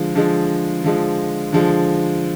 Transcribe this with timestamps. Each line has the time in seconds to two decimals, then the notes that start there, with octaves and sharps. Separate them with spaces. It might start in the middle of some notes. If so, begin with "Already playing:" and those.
Already playing: D3 F3 G#3
0.15 D3 F3 G#3
0.84 D3 F3 G#3
1.52 D3 F3 G#3